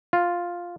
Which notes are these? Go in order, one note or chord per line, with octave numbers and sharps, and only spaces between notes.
F4